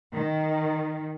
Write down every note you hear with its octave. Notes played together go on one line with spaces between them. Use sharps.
D#3